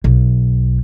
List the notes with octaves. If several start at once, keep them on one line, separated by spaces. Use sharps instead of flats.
B1